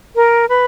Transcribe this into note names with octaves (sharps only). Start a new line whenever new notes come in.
A#4
B4